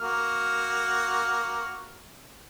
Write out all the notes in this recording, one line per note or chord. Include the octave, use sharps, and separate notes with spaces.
A#3 F#4 F6